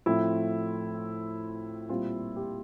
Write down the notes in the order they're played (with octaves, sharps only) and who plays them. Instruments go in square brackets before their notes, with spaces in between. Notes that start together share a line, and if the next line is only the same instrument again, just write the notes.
[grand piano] A2 F3 C4 E4
A#2 G3 C4 F4
G4